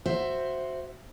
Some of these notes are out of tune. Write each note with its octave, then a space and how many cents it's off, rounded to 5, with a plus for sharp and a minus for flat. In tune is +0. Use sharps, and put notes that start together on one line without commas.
F#4 +0 C5 +0 E5 +10